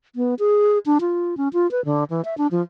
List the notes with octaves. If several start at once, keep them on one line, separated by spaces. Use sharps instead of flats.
B3
G#4
D4
F4
C#4
F4
B4
D3
E3
E5
D4
F3